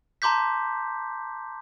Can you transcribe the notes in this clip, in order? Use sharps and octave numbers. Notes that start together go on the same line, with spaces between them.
A5 A#5 C6 D6 G6 B6